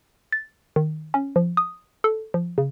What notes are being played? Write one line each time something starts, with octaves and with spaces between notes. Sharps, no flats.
A6
D#3
C#4
F3
D#6
A4
F3
C#3